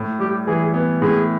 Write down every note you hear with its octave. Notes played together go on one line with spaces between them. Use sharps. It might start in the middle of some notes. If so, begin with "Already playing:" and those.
Already playing: A2
G3 G4
E3 G#4
B3
A2 G#4